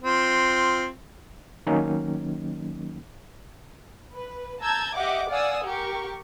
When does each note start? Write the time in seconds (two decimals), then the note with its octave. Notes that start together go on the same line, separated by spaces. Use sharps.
0.03 C4 F4
1.67 D#3 F#3 A#3 C#4 D#4
4.13 B4
4.61 A5 A#5 E6 G6 G#6
4.94 G4 D#5 E5 F#5 D6
5.29 D5 F5 F#5 G#5 D#6 E6
5.64 G4 A#4 C#6